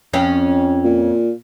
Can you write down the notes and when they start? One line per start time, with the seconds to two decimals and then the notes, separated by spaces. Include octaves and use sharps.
0.13 F2 C#4
0.84 A#2